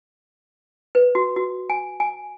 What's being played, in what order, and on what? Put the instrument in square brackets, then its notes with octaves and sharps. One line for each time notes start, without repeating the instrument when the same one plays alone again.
[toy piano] B4
F#4
F#4
G#5
G#5